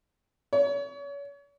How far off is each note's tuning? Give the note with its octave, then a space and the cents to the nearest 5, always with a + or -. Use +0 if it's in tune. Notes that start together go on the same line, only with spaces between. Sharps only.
C#5 +35